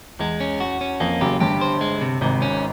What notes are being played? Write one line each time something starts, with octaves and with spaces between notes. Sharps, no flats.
E2 G#3
C#4
F#4
C#4
F2 A#3
F#1 F#2 G4
G1 G2 G4
C5
G#3
C3
G#1 G#2 C3
C#4